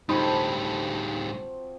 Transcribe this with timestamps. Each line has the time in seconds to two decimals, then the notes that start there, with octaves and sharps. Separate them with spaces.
0.09 D2 A2 F3 G3 C4 D#4 F#4 B5